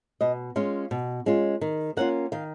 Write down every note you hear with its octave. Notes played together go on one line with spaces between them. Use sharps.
B2 D#5
G#3 C#4 F4 F5
B2
G#3 C#4 F4
D#3
A#3 C#4 F4 F#5
D#3 F5